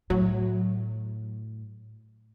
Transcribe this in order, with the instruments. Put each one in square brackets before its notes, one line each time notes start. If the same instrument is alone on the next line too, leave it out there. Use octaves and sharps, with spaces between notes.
[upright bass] A2 [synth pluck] F#3